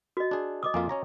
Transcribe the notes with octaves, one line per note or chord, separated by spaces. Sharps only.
F#4 D#5
D4 G#4
D#5 D6 D#6
F2 A#3 F4 F5 G#5
C#4 C#5 A#5